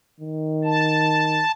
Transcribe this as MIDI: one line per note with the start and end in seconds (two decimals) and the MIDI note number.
0.21 1.43 51
0.64 1.52 81